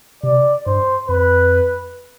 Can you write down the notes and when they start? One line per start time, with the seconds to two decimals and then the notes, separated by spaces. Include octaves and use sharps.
0.23 C3 D5
0.66 G2 C5
1.09 F2 B4